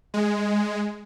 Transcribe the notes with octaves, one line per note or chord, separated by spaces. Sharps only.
G#3